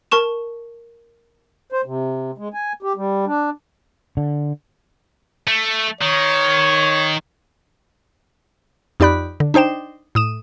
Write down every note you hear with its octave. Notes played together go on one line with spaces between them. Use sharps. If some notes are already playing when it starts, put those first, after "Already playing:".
A#4 A5 C#6 E7
C5
C3
G#3
G#5
G4
G3
D4
D3
A3
D#3 C#5
F2 D#4 G4 D5 B5 F#6
D3
D4 D#4 C5 G5 E7
A2 D#6 E7